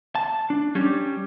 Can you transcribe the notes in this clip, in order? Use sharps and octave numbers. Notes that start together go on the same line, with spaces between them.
A5
D4
G3 C#4 G4